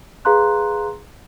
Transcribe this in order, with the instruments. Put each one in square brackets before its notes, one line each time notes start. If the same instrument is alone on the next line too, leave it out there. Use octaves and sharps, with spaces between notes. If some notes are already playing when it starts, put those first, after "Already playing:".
[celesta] G#4 B4 F5 A#5 C6 F#6